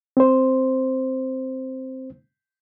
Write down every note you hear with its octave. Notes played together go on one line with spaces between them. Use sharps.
C4 C5